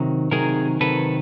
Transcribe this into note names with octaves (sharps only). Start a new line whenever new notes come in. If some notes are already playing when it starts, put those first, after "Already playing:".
Already playing: C3 D#3 F#3
C3 D#3 F#3 G#4 A#4
C3 D#3 F#3 A4 B4